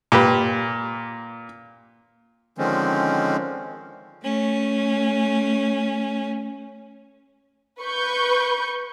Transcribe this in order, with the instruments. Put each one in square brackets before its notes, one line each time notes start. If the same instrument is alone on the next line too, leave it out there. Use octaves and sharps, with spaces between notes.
[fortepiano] A#2 G4 B4
[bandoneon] D3 D#3 F3 G#3 C4 C#4
[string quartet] A3 C#4
[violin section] B4 C#6 G6